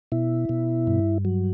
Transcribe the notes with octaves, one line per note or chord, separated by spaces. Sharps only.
B2 E4
B2
G2
F#3